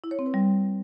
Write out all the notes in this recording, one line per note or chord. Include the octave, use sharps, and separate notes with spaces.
E4
C#5
C4
B4
G3